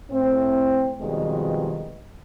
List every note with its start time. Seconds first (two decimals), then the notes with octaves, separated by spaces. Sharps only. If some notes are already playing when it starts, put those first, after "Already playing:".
0.10 A2 C4
1.00 F2 B2 D#3 G3 G#3